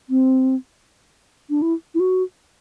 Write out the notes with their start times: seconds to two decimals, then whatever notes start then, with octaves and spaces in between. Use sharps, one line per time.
0.10 C4
1.50 D4
1.62 E4
1.95 E4
2.00 F#4